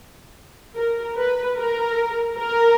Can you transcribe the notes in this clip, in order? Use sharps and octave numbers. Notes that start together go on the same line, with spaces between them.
A#4
B4
A#4
A#4